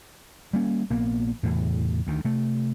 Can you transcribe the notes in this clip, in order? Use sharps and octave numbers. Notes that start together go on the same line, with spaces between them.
G3 A#3 C#4
A#1 A#3 B3
E2 A2 C3 E3
D2 D#3
C3 A3